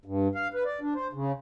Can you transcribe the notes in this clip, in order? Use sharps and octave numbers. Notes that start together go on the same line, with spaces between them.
G2
F5
B4
D5
D4
C5
C#3